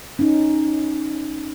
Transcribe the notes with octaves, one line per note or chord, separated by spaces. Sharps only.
C#4 D#4